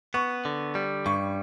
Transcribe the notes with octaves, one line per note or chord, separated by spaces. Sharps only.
B3 C#6
D3
G3
G2 C#6